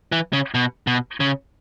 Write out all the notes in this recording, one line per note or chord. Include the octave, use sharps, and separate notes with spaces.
E3
C#3
B2
B2
C#3